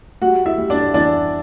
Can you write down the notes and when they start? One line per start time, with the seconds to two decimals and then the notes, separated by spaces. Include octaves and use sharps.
0.22 G3 F#4 F#5
0.46 E4 E5
0.58 G3
0.70 D4 D5
0.94 E3 D4 D5